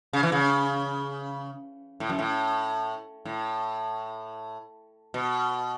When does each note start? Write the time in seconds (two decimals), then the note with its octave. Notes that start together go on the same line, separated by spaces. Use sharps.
0.13 C#3
0.23 E3
0.32 C#3
2.00 A2
2.09 F#2
2.19 A2
3.25 A2
5.14 B2